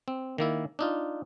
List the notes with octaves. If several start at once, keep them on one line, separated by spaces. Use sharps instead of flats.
C4
D#3 A#3 E4
D4 D#4 F4